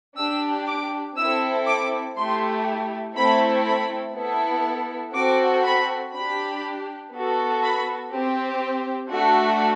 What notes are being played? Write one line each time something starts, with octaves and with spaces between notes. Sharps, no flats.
D4 G4 E6
D6
C4 E4 A4 E6
D6
A3 E4 G4 C6
A3 C4 E4 A4 B5
B5
B3 E4 A4
C4 F#4 A4 D6
B5
D4 G4 B5
B3 F#4 A4
B5
C4 G4
A3 D4 F#4 A4